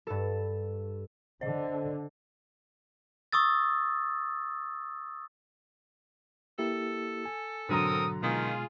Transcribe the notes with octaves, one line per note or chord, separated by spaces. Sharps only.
G2 A4
D3 C5 D#5
C#6 D#6 E6 A6
A#3 E4 G4 A4
G#5
G#2 B2 D3 F#3 C4 A#4 A#5 D#6
B2 D#3 G#3 F4 G#4